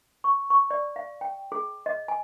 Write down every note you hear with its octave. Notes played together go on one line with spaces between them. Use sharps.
C#6
C#6
D5
F5
G5
G#4
D#5
G#5